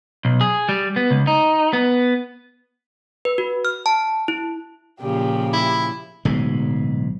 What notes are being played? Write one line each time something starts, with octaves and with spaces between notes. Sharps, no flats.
B1
G#4
G3
B3
C#2
D#4
B3
B4
F#4
F6
A5
E4
A#2 C#3 F3 G4
E4
D1 B1 G#2 G#3